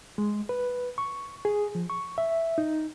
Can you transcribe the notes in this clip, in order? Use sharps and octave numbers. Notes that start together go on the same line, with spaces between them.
G#3
B4
C#6
G#4
F3
C#6
E5
D#4